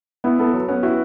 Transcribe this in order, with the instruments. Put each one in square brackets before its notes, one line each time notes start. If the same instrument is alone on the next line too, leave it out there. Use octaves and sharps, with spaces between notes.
[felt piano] B3 [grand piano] E4
[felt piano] B3 [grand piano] A4
[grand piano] F#3
[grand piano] B3 [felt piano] C#4
[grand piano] E4 [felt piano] F#4